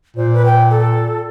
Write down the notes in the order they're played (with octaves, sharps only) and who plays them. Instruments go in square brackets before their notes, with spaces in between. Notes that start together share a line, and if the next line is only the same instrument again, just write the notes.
[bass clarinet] A#2 [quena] C5
[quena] B4
G5
A4